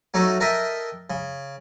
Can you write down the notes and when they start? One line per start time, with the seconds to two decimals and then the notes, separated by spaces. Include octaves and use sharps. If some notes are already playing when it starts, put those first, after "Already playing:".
0.14 F#3 A3 C#4 D#4
0.40 A4 A#4 D#5 E5 G5
1.10 C#3